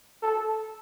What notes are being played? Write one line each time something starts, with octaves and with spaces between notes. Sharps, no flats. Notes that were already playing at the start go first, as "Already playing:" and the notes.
A4